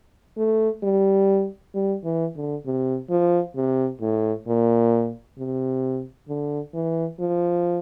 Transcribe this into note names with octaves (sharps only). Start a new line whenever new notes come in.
A3
G3
G3
E3
D3
C3
F3
C3
A2
A#2
C3
D3
E3
F3